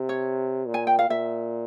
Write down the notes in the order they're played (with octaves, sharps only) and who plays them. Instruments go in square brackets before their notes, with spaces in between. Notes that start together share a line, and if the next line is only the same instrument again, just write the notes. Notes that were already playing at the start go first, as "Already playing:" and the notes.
Already playing: [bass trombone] C3
[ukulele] C#5
[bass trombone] A#2
[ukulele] G#5
G5
F5
[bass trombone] A#2 [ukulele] E5